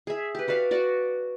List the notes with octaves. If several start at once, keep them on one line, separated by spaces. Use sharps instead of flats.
G#4 E5
G4 B4
F#4 B4 D5 F5
F#4 D5